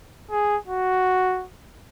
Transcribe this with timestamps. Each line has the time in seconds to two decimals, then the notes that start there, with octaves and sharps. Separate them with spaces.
0.31 G#4
0.68 F#4